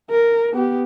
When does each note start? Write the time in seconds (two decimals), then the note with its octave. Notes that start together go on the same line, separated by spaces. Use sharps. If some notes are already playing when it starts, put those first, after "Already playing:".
0.10 A#4
0.53 B3 G4